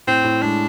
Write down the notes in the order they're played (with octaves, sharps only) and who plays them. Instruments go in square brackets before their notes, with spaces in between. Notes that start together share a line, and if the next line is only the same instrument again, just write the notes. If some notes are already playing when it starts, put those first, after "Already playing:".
[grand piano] A2 [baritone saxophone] C4
[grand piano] A2
[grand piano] G#3 [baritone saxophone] D4